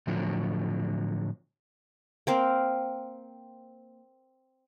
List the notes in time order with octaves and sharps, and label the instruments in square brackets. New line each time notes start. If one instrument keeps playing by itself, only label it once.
[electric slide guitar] A2 D3 F3 F#3
[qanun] A#3 C4 F5